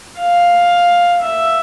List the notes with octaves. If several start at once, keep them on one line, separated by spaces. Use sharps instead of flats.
F5
E5